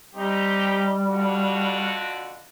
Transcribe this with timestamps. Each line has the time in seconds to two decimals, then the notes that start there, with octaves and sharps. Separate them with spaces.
0.14 G3 C4 D#4 G4
1.08 F2 D3 F#4